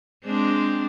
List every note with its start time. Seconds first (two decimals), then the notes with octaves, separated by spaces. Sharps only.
0.25 G#3 C4 D4